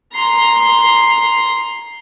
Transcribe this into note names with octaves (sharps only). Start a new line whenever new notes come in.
A#5 C6